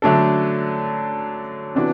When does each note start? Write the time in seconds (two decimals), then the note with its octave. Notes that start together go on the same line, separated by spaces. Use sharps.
0.02 D3 F#3 A3 D4 A4
1.75 C3 E3 B3 D4 F#4